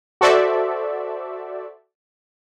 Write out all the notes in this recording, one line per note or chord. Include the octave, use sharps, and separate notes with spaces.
F#4 A4 C5 D5 E5